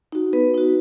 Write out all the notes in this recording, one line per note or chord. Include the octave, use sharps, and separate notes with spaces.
D#4 F#4
B3 B4
D#4 F#4